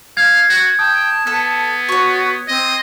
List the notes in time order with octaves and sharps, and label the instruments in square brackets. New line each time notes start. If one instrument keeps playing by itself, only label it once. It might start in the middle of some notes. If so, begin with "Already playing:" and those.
[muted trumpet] F5 [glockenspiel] G#6
[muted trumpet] F#4
[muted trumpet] G5 [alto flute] A5 [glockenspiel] D#6
[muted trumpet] B3 [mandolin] A4
[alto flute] F#4 [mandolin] C#5 C#6
[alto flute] C4 [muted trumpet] D#5